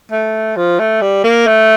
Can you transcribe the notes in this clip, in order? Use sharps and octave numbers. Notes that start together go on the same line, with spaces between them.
A3
F3
A3
G3
A#3
A3